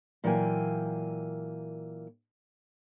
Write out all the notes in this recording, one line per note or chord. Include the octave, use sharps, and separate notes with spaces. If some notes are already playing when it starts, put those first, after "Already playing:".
A#2 E3 F#3 A#3 G5 G#5